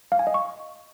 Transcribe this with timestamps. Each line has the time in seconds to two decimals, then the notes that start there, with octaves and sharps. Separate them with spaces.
0.12 F5
0.19 G#5
0.27 D#5
0.34 C#6